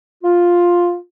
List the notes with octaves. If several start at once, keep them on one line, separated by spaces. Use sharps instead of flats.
F4